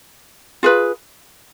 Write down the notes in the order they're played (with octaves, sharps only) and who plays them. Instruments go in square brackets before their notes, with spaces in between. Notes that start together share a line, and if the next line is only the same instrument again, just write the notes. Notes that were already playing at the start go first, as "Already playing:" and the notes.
[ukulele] F4 G#4 B4